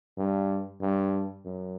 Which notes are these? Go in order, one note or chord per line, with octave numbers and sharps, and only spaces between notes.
G2
G2
F#2